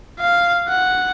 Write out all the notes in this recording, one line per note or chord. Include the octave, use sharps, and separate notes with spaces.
F5
F#5